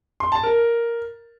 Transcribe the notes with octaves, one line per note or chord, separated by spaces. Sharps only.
C6
A5
A#4